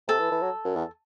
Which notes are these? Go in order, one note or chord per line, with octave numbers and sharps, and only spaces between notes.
C3 A4
E3
E3
F#3
F#2
E2